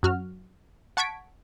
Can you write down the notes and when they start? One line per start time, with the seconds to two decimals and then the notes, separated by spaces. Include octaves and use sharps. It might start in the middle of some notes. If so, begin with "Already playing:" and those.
0.03 F#2 F#4 F6
0.97 F#5 A5 C#6 G#6 B6 D7